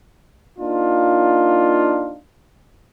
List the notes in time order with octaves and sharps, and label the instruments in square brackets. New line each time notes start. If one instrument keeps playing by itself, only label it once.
[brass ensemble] A#3 D4 D#4 F4